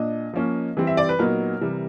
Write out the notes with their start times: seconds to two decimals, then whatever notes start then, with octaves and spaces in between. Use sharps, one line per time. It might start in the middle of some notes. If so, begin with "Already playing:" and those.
Already playing: A#2 D4 D#5
0.33 F3 A#3 C#4
0.77 E3 G3 C4
0.87 E5
0.97 D5
1.09 B4
1.19 A#2 F#3 B3 D#4 A#4
1.61 C3 E3 G3